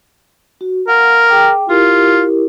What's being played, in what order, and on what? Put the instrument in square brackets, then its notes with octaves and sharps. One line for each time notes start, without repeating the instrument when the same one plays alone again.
[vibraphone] F#4
[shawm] A#4 [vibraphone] F5 F#5
[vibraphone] G#4 G5 D6
[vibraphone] E4 G4 A#4 [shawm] F4